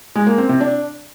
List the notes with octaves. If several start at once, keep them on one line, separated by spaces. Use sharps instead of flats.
G#3
A#3
C4
C3
D4